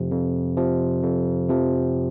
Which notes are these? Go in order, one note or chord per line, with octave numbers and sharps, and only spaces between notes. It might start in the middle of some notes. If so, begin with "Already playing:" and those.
Already playing: F2 C3 F3
F2
C3 F3
F2
C3 F3